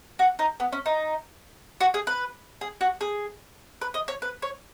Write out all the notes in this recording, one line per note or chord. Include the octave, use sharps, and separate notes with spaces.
F#4
D#4
B3
C#4
D#4
F#4
G#4
B4
G#4
F#4
G#4
B4
D#5
C#5
B4
C#5